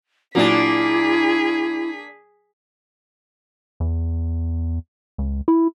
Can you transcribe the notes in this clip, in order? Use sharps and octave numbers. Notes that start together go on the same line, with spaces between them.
A#2 F#3 A#3 D4 E4 G#4 B6
E2
C#2
E4